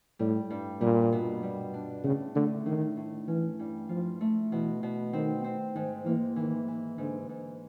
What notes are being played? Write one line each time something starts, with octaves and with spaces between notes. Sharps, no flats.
A2 G3
G2
A#2 G3
B2
G3
D4
A2 C#3
D3 A3
A2 D#3
A2
E3 C#4
G2
F3 F4
A3
B2 E3
B2
D#3 C4
C4
G#2 D#3
E3 A#3
D#3 E3
E3
G#2 D3
G#2